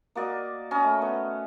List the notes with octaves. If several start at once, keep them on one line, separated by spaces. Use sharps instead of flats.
A#3 F#4 D5 D#5
C#4 D#5 A#5
A3
B3